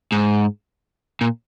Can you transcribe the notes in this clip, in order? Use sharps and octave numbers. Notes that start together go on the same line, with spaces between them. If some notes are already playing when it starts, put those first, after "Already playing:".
G#2
A#2